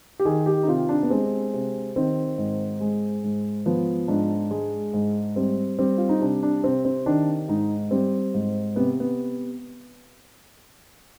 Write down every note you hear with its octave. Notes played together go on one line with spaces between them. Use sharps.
G4
D#3 G#4
G4
D#4
C3 F4
D4
B3
G#3 C4
C3
D#3 C4
G#2
G#3
G#2
F3 B3
G#2 D4
G#3
G#2
G3 C4
G3 C4
F4
D#4
C3 D4
D4
C3 C4
C4
D#3 D4
G#2 D#4
G3 C4
G#2
C3 B3
B3